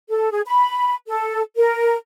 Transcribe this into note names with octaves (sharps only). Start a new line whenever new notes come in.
A4
G#4
B5
A4
A#4